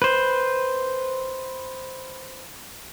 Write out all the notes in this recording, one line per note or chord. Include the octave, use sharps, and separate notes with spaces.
B4 C5